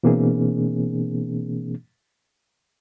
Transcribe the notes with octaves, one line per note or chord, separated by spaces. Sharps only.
B2 E3 A#3 C4 D4 G#4